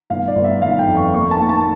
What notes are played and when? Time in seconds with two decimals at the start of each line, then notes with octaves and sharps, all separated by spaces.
0.10 G1 F5
0.28 D5
0.35 G1
0.44 E5
0.62 G1 F5
0.79 G5
0.87 F2
0.97 C#6
1.13 A#3 C#6
1.31 A5
1.40 A#3
1.49 A5